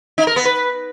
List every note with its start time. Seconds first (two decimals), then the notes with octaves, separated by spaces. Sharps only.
0.18 D#4
0.27 A#4
0.36 B3
0.45 B4